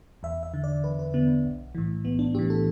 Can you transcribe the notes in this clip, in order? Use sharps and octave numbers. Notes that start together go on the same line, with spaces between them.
E2 E5
E5
D3
D5
E2 B4
B4
D3 B3
B1
A2 E3
B1 B3
D4
A2 E3 G4
A4